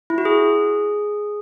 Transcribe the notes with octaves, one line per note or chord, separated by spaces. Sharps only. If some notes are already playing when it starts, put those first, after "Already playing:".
E4
F#4
G#4